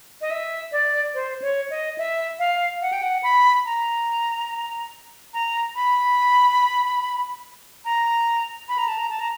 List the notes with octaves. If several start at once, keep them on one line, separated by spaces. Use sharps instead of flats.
D#5
E5
D5
C5
C#5
D#5
E5
F5
F#5
G5
F#5
B5
A#5
A#5
B5
A#5
B5
A#5
A5
A#5
A5
A#5